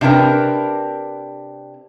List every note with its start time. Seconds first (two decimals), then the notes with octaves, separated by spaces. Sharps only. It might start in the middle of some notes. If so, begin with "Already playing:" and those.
0.01 C3 D4 E4 A#4 B4